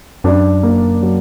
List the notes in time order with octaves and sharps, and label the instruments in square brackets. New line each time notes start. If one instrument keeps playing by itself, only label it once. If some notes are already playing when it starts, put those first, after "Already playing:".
[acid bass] F#2 [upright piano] D4
[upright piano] A#3
F#3